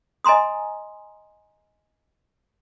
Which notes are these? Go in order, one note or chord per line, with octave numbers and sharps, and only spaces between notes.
D#5 G#5 A#5 C6 D#6